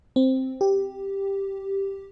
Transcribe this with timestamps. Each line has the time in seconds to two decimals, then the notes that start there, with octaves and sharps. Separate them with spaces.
0.16 C4
0.61 G4